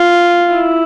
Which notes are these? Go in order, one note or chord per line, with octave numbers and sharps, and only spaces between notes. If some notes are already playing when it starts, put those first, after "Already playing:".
Already playing: F4
E4